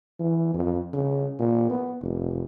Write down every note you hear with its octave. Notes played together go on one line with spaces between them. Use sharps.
E3
F2
C#3
A#2
B3
F1